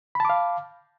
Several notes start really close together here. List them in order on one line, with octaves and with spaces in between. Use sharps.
B5 A5 D6 F5